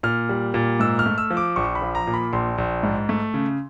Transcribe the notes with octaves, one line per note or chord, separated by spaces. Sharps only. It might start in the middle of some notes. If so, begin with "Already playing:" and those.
A#2 F6
G3
A#2
G#2 E6
F6
A3
E6
F3
D6
A#1 C#6
B5
F3
A#5
A#2
B5
A#1 C6
A#1
G#2
A3
C#3